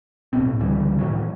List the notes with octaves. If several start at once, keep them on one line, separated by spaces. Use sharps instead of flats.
D1 B1 B2 C4
A2
C#2 D3 E3 G3
A2 D#3 E3 F#3